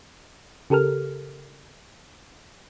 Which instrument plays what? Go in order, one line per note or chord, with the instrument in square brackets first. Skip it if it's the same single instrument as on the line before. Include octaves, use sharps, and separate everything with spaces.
[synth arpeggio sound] C#3 G4 A4 A#4 F6